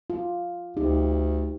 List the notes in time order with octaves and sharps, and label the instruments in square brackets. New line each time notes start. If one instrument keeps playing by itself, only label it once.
[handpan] F4
[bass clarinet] D2 [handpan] D#4 G4